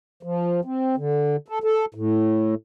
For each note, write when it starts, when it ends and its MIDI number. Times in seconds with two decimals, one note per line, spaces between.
0.23 0.61 53
0.65 0.96 60
0.97 1.36 50
1.48 1.59 69
1.64 1.85 69
1.95 2.55 45